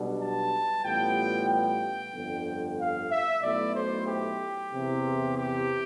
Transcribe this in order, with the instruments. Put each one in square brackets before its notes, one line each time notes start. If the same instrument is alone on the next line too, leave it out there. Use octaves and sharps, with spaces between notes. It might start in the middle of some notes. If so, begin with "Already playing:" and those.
Already playing: [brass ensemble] B1 B2 G3 D4
A5
A1 A2 G3 B3 F4 G5
G5
G1 F2 D3
F5
E5
B1 B2 A3 E4 D5
C5
G4
E2 C3 E3
G4